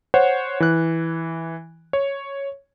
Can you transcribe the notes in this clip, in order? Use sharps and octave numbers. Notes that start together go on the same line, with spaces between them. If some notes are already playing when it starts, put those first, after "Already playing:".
C5 C#5 F#5
E3 F#6
C#5